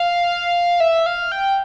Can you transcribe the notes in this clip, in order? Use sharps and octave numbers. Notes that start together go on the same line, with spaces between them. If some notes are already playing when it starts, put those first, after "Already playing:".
Already playing: F5
E5
F5
G5